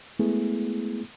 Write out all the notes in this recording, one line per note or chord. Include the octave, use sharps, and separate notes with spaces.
G#3 A3 B3 E4 G#4